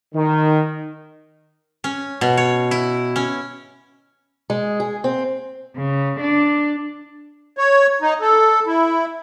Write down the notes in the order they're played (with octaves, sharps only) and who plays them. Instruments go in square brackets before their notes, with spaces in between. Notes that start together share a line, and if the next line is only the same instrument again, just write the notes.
[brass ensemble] D#3
[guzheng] C#4
B2
C#5
E4
C#4
[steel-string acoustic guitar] G#3
G#4
C4
[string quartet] C#3
D4
[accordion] C#5
D#4
A4
E4